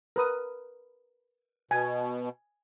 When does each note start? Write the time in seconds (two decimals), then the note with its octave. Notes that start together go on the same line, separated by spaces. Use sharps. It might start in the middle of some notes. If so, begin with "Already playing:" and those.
0.16 A#4 B4 D#6
1.71 B2 G#5